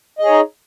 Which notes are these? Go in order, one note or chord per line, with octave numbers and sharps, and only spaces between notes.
D#4 G#4 C#5 D#5